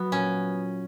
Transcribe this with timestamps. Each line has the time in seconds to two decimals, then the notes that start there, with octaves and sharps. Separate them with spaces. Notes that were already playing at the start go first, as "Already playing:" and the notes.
Already playing: F#3 B3 F#4
0.12 A#2 C#4